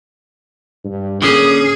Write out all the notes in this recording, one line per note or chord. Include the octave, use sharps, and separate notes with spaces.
G2
D3 A#3 C#4 G#4 D#6